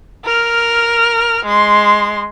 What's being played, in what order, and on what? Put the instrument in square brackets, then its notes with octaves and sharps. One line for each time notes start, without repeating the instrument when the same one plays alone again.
[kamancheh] A#4 F6
G#3 C6